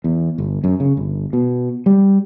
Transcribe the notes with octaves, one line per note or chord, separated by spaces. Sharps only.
E2
G1
F#2
C#3
G1
B2
G3